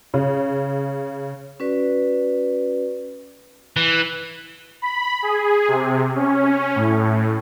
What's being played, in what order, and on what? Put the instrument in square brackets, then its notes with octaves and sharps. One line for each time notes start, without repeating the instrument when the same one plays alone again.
[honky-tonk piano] C#3
[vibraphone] C#4 F#4 B4 D5
[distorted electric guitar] E3
[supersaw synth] B5
G#4
C3
C#4
A2